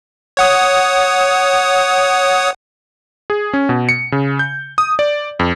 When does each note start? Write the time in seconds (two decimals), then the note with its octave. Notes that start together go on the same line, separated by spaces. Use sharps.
0.37 C#5 F#5 D#6
3.30 G#4
3.53 C#4
3.69 B2
3.89 C#7
4.12 C#3
4.39 G6
4.78 D#6
4.99 D5
5.39 F2